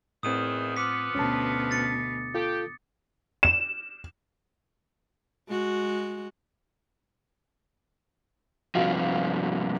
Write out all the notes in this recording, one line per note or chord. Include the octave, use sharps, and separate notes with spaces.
E2 A2 D#3 C4 D#6 D#7
F3 B3 D6 B6
D2 B2 C#4 A5
A6 C#7
F4 G4 A4
E7
G#3 F#4
G2 C3 F3 F#4 F5